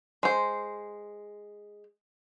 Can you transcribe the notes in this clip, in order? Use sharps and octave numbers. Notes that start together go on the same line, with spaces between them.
G#3 C5